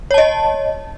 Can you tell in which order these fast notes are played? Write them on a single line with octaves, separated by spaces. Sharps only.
C#5 A5 D#5